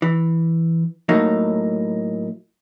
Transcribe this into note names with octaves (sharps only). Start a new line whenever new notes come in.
E3
A2 F#3 A3 A#3 D#4